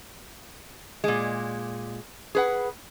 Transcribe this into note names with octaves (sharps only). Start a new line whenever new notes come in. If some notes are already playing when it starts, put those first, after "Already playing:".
A#2 G#3
G#4 B4 F#5